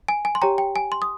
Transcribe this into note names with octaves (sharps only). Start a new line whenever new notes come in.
G#5
G#5
C6
G4 C#5 G5 A#5
G5
G#5
C6
D#6